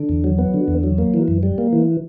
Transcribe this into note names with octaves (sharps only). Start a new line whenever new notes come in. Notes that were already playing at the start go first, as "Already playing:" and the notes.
Already playing: D3
E2
F#3
B3
D3
E2
F#3
A#3
E3
F#2
G3
A#3
E3